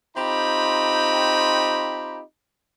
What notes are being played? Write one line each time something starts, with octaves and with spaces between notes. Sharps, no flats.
C4 D#4 F4 G4 A#5 B5